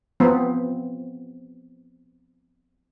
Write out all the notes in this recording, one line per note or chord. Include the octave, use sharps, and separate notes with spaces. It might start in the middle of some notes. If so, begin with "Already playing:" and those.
F3 B3 C4